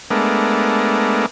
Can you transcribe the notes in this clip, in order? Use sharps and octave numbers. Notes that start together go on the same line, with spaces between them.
G#3 A3 B3 D4 A#4